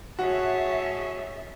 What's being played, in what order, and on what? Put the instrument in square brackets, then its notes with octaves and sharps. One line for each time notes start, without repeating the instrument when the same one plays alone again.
[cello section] A2 G#4 E5 [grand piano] F#4 [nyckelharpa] C#5 A5